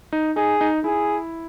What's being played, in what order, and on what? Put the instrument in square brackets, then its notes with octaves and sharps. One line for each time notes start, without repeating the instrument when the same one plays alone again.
[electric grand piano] D#4
[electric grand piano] D#4 [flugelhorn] G#4
[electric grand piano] D#4
[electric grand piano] E4 [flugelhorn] G#4